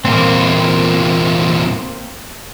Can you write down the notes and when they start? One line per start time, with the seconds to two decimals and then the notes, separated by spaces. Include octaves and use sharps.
0.05 E2 A#2 A#3 C4